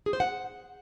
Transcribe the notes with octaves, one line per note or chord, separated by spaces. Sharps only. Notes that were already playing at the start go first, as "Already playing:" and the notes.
G#4
C5
F#5